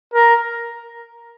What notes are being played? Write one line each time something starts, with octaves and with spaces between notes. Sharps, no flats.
A#4